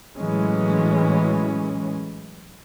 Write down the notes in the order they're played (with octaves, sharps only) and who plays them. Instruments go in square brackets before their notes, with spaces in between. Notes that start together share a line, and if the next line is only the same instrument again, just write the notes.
[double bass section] A2 E3 F#3 G#3 C#4